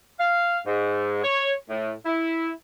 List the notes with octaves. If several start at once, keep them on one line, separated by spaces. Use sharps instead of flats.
F5
G#2
C#5
A2
E4